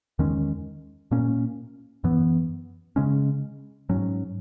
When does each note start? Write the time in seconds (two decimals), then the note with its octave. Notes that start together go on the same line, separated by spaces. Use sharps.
0.19 E2 D#3 G#3 C#4
1.11 A#2 A#3 C#4
2.04 F#2 E3 B3
2.96 C#3 G#3 C#4
3.89 G#2 F#3 C#4